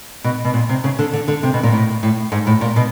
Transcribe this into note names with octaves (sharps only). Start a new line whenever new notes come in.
B2
B2
A#2
C3
C#3
D3
D3
D3
C3
B2
A#2
A2
A2
G#2
A2
A#2
B2